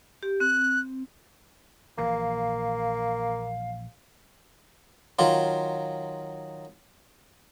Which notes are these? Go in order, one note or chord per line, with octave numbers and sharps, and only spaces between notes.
G4
C4 F#6
A#1 A#2 E3 A#3 F5
D#3 F#3 F4